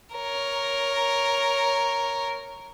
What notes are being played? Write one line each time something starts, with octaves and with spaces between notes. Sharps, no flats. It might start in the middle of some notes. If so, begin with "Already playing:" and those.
A#4 C#5